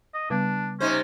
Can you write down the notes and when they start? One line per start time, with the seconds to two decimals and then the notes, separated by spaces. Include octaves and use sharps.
0.14 D#5
0.30 C#3 G3 B3 D4
0.80 C3 C#4 D#4 C5